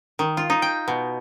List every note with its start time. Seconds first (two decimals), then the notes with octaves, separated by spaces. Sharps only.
0.19 D#3
0.37 F4
0.50 D#4
0.62 G5
0.88 B2